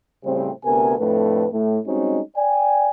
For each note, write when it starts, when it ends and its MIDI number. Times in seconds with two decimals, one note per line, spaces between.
0.24 0.51 45
0.24 0.51 49
0.24 0.51 55
0.24 0.51 60
0.64 0.93 38
0.64 0.93 48
0.64 0.93 59
0.64 0.93 70
0.64 0.93 80
0.99 1.47 41
0.99 1.47 45
0.99 1.47 57
0.99 1.47 62
0.99 1.47 71
1.52 1.79 45
1.86 2.19 55
1.86 2.19 56
1.86 2.19 60
1.86 2.19 61
1.86 2.19 63
1.86 2.19 66
2.37 2.90 74
2.37 2.90 79
2.37 2.90 80